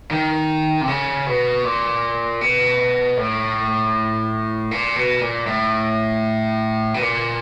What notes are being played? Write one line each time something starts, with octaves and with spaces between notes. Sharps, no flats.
D#3
C3
C#3
B2
A#2
B2
A2
A#2
B2
A#2
A2
B2
A#2